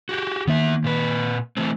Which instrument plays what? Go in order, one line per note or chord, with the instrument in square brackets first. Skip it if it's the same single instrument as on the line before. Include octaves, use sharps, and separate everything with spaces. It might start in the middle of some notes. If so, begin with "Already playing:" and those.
[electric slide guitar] F#4 G4
[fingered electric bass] D#3 A#3 [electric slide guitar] B3 E5
[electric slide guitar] A#2 B4
E3 A3 C4